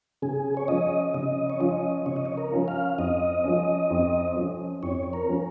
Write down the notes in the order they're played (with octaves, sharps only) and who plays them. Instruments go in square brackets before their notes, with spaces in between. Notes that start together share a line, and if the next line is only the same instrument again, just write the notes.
[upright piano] C#3 [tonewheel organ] G#4
[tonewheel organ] C#5
[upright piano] F3 C#4 F4 [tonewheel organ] D#5
[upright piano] C#3 [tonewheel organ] D#5
[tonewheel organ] C#5
[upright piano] F3 C#4 F4 [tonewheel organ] D#5
[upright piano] C#3 [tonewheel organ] C#5
[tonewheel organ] D#5
C#5
A#4
[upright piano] F3 C#4 F4
[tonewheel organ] F5
[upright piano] F2 [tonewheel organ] D#5
[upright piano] F3 C#4
F2
F3 C#4
[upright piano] F2 [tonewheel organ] C#5
[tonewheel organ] A#4
[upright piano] F3 C#4